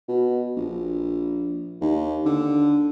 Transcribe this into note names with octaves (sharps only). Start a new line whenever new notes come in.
B2
A#1
D#2
D3